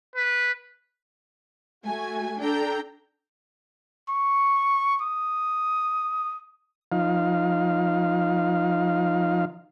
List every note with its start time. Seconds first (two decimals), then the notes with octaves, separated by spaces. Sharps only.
0.16 B4
1.85 A3 F#4 G#5
2.40 D4 A4 G5 A#5
4.09 C#6
5.02 D#6
6.92 F3 D#4 F5